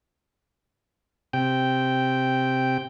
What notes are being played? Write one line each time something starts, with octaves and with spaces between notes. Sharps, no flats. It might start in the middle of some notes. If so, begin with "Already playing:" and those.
C3 G5